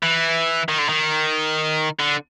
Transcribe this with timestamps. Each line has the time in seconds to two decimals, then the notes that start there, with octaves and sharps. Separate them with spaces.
0.03 E3
0.69 D#3
0.78 D3
0.89 D#3
1.99 D3